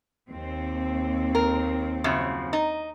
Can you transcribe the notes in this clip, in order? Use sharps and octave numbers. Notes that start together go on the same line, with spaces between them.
D#2 C4
A#4
F#2 C#3 F3
D#4